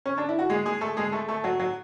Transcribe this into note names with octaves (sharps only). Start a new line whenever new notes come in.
C#4
D4
E4
F#4
G#3 G#4
G#3 G#4
A3 A4
G#3 G#4
A3 A4
A3 A4
F#3 F#4
F#3 F#4